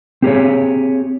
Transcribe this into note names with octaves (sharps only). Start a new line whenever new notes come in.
C4 G4 G#4 C#5